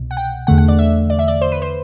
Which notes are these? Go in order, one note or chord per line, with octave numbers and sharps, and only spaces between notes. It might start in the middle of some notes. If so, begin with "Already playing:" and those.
Already playing: C2 B2
F#5
G5
E2 D3 A3 F#5
F#5
D5
E5
D5
E5
D5
C5
B4
C5